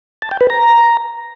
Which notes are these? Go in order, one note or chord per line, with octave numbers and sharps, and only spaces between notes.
A5
G5
B4
A#5